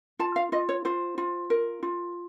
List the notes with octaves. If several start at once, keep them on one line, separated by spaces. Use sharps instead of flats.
F4 A5
F5
F4 D#5
C#5
F4 C5
F4
A#4
F4